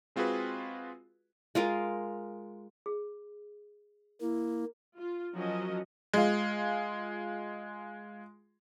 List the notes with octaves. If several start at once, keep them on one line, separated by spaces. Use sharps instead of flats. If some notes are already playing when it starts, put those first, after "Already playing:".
G#3 C4 F4 F#4 G#4 B4
G#3 F4 A#4
G#4
A#3 E4
F4
F3 F#3 C#4 F#4 A#4 D#5
G#3 F4